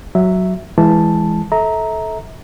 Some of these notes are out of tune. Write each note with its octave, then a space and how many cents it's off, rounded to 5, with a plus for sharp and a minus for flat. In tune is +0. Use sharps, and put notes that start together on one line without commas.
F#3 +0 E5 +0
E3 +0 G#3 +0 A5 +0
A4 -15 E5 -35 A#5 +0